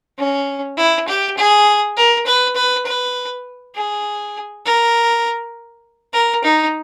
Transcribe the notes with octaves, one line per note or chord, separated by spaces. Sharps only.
C#4
E4
G4
G#4
A#4
B4
B4
B4
G#4
A#4
A#4
D#4